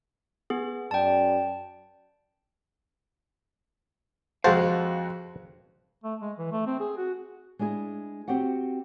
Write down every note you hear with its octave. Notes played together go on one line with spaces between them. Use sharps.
B3 G#4
F#2 D5 G5 A5
F2 G#3 F#4 C5 F5 A5
A3
G#3
E3
A3
C4
G#4
F#4
G#3 D4 E4 G#4
C4 F#4 G4 F#5